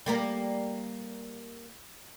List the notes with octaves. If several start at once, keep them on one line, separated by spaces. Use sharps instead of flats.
G3 A#3 A#4